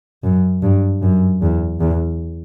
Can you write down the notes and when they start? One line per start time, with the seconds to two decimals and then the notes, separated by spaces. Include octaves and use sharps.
0.23 F#2
0.62 G2
1.02 F#2
1.42 E2
1.80 E2